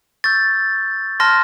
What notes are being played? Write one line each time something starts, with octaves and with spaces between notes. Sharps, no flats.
C#6 E6 G6 A6
A5 C6 F6 A#6